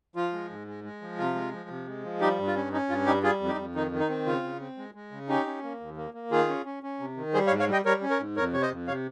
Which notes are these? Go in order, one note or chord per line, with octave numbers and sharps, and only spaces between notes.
F3 F4
G#3
G#2
G#3
G#3
F3
C3 F4
G#3
F3
C3
G#3
F3
G3 D#4 G4
G2
F4
C#4
C#4 D#4
G2 F4
G3 D#4 G4
G3 F4 G#4
F2
D#4 G4
F2
D#3 D#4
D#3
D#4
C4
C#3 F4
C#3
C4
G#3
G#3
C#3
C#4 D#4 G4
C#4
A#3
D#2
A#3
A#3
D#3 F4 G#4
C#4
C#4
C#4
C3
D#3
G3 G#4 C5
C#5 F5
G#2
C#5 F5
G3 D#5 G5
G3 A#4 C#5
C#4
A#4 C#5
G#2
F2 A#4 C#5
C3 C#5
C5 D#5
F2
C3 C#5 F5